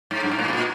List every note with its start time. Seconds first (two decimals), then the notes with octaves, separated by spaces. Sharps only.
0.11 G#2
0.23 G2
0.31 G#2
0.39 A2
0.48 B2
0.53 A#2